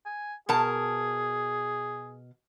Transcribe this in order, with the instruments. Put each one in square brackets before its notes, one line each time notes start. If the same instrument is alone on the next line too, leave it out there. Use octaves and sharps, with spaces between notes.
[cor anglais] G#5
[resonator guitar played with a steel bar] B2 A#4 A5 [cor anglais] G#4